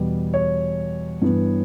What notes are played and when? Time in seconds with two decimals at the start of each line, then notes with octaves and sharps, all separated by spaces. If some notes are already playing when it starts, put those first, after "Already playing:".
Already playing: E2 B2 G3 B3
0.34 C#5
1.22 G2 E3 B3